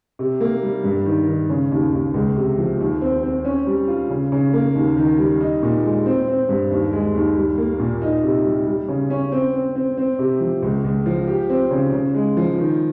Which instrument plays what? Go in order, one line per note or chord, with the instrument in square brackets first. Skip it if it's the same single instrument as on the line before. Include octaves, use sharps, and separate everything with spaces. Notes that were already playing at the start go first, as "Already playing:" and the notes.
[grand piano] C3
A#3
G3
G2
D#3
D#3
C#3
D#2
D#2
C#2
C3
F3
D#2
C4
C4
C#4
G3
F4
C#3
C#3
A#3
D#2
D#3
G3
D#4
A#2
G#3
C4
C4
G2
D#2
G#3
D#2
G3
A#3
A#2
D#4
C3
G3
G3
C#3
C#4
C4
C4
C4
C4
C3
F3
C#2
C#2
F3
G4
C4
C#3
C#3
G#3
F3
D#3